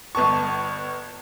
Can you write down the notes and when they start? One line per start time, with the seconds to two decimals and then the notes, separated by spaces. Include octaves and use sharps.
0.15 G1 B3 A5 C#6